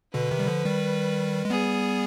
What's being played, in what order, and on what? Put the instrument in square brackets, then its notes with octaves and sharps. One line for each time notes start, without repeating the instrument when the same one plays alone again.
[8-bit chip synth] B2 D3 [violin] B4
[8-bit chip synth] C3 D#3
G3
D3 F3
D#3 G3
G#3
[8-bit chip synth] G3 B3 [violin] G#4